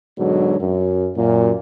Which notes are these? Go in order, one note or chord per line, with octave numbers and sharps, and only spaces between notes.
G#2 B2 D3 F#3
F#2
F#2 A#2